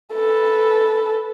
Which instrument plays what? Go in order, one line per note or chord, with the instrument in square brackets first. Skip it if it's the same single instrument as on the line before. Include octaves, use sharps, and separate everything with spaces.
[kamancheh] A4 B4